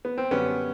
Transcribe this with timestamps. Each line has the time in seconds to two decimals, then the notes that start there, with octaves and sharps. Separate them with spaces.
0.05 B3
0.18 C4
0.31 F#2 D3 G3 B3 C#4